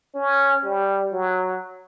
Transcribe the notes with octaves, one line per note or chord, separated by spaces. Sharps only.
C#4
G3
F#3